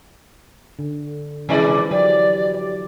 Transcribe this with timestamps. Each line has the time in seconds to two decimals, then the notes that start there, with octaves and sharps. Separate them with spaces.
0.79 D3
1.49 C3 E3 F3 G#3 E4 D5
1.91 F#3 G4 D5
2.54 D5